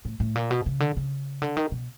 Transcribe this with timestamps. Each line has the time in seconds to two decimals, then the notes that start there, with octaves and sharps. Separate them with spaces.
0.05 A2
0.20 A2
0.35 A#2
0.51 B2
0.66 C#3
0.80 D3
0.97 C#3
1.42 D3
1.57 D#3
1.72 B2